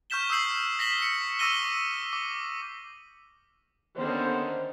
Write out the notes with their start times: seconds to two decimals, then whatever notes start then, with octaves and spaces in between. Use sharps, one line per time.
0.10 C#6 F6 G6 B6 E7 G7
0.30 D#6 E6 G6 C7 F#7
0.79 A#6 B6 E7 F#7 G7
1.02 C#7
1.39 C#6 D6 E6 A#6 D#7 G7
2.13 D6
3.98 D#2 D3 D#3 B3 C#4 C5